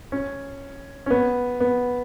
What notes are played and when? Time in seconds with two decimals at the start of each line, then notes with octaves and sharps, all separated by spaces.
0.12 C#4
1.06 C#4
1.10 B3
1.60 B3